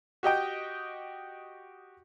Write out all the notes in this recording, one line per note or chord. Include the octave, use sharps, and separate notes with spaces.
F#4 G4 D#5 G5